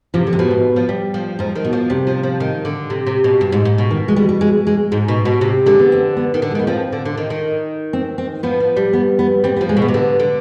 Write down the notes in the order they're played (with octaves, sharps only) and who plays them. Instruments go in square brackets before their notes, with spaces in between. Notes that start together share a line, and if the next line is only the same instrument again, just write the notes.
[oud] C3 [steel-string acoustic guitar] F3
[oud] D3
[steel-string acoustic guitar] C3
[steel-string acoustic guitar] B2 [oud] F3
[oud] G#2
F3
G3
F3
[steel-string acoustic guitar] G#2 [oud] F3
[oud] D#3
[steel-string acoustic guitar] B2
[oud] F3
[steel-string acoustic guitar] C3 [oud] G3
[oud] F3
F3
D#3
D3
C3
C3
B2
G2
G#2
G#2
B2
[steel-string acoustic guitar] D#3
G#3
G3
G3
G#3
G#3
[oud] G#2
B2
B2
C3
[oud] D3 [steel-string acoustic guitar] G#3
[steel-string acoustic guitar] B3
C4
B3
[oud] D#3
D3
[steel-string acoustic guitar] G#3
[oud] D#3 [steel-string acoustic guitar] B3
[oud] F3 [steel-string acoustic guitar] C4
[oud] D3
D3
D#3
D#3
[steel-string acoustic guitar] C4
C4
[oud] F3 [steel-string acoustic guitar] B3
[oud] F3
G3
[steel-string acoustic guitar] B3
B3
[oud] G3 [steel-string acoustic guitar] C4
[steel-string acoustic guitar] B3
[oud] F3
[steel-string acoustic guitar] G#3
[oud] B2
[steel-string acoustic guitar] B3
[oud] C3
[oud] D3 [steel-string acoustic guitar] B3
[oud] D3